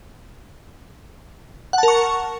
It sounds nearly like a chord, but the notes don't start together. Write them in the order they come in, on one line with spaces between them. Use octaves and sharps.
F#5 A5 A#4 C#6